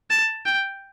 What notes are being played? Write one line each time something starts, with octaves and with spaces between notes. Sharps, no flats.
A5
G5